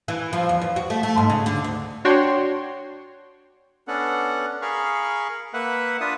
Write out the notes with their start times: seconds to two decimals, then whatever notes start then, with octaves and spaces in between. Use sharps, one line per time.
0.08 E3
0.33 F3
0.49 E2
0.61 E2
0.76 F#4
0.90 A3
1.03 A3
1.18 G#2
1.30 C#3
1.46 D3
1.64 D2
2.05 D4 F#4 C#5 G5 C6
3.88 B3 C#4 D4 A4 F#5
4.62 G#4 A#4 F5 B5 C#6
5.54 A#3 B4 E5 F#5
6.01 D4 F4 B4 E5 D#6